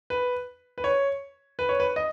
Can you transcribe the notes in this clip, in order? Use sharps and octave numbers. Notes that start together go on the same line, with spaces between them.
B4
B4
C#5
B4
C#5
B4
D#5